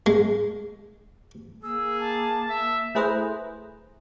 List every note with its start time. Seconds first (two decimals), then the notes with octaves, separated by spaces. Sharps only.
0.06 G#3
1.63 A#3 G#4 E6
2.00 A5
2.50 E5
2.95 A3 E4 G#4 B4 C5 A#5